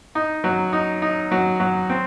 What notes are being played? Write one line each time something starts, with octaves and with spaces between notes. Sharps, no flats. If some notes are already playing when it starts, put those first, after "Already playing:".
D#4
F#3
D#4
D#4
F#3
F#3
C4